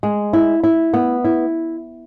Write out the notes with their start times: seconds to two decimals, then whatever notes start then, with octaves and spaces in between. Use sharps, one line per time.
0.03 G#3
0.33 E4
0.64 E4
0.94 B3
1.24 E4